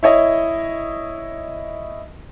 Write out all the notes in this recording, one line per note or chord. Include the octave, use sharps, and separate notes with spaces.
E4 C#5 D#5